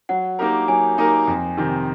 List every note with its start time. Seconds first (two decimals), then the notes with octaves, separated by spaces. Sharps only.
0.09 F#3 F#5
0.39 A#3 D#4 G4 A#4
0.68 F#3 G#5
0.98 A#3 D#4 G4 A#4
1.28 F2
1.57 C3 D#3